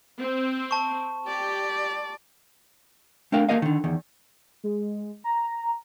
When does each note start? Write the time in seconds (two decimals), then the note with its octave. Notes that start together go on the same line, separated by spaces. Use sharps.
0.19 C4
0.71 A5 C#6
1.27 G4 D5
3.32 A3 C4 D4 A#4 F5 G5
3.49 A3 A#3 D#4 A#4 D#5 F5
3.62 D3 D#3
3.84 E2 D#3
4.64 G#3
5.24 A#5